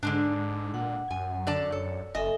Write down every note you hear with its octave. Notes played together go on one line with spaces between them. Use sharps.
G#2 D3 G#3 D4
A#2 F#5
F#2 G#5
D3 D5 A5
A4 C#5
F#1 A4 D#5 E5 G#5